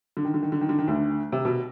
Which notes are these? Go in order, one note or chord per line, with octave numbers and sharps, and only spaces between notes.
D3
D#3
D3
D#3
D3
D#3
D3
D#3
D2 D3
C3
B2